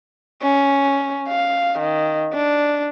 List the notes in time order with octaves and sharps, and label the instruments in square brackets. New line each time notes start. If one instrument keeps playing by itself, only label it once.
[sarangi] C#4
F5
D#3
D4